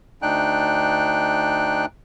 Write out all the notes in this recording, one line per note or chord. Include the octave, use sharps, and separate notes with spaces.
D2 D4 D#4 G5 F#6